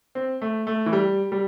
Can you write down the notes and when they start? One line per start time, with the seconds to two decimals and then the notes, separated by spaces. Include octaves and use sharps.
0.15 C4
0.42 A3
0.67 A3
0.86 E3
0.93 G3
1.32 G3